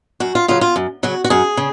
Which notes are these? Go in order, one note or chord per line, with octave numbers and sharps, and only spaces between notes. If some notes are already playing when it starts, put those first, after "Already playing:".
F#2 F#4
F4
C#3 F#3 F4
F4
F#2
C#3 F#3 F#4
F#4
F#2 G#4
C#3